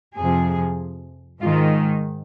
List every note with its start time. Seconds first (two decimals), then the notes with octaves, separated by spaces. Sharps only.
0.17 F2 C3 F3 G#4
1.41 G#2 D#3 F4